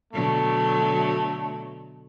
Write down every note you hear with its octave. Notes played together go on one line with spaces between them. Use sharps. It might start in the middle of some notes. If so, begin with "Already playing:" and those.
B2 D3 F#3 A3